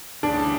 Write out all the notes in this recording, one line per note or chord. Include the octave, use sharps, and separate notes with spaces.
D2 C#3 E3 G3 D4